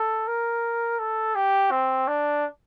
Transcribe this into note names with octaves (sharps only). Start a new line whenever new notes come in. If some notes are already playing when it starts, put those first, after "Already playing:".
Already playing: A4
A#4
A4
G4
C4
D4